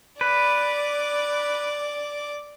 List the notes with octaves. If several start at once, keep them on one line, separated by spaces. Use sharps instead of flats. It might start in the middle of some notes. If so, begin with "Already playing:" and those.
B4 D5 D6